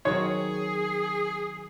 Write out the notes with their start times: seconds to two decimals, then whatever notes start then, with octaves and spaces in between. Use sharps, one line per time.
0.05 D#3 F#3 C4 G#4 C#5